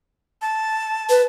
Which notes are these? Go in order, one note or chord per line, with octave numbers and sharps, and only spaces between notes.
A5
B4